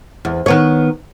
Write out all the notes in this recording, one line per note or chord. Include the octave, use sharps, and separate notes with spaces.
E2
D#3 B3 C#5